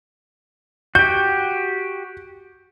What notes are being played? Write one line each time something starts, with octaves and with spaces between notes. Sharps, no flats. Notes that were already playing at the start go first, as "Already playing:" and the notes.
F#4 G4 G6